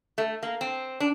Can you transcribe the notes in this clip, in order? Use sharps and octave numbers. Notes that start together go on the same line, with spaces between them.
A3
A#3
C4
D4